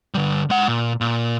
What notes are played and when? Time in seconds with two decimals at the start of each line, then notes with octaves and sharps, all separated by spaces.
0.15 D3 G3
0.50 G#3 F#5
0.68 A#2
1.01 A#2